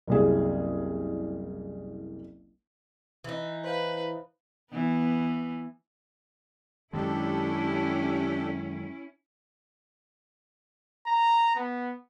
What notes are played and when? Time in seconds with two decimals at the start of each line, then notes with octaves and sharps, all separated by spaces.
0.08 F#1 C2 G#4
3.24 E3 D#4
3.64 B4 C5 F5
4.71 E3 B3
6.93 F#2 D#3 G#3 C#4 D4 E4 G4 A4
11.07 A#5
11.56 B3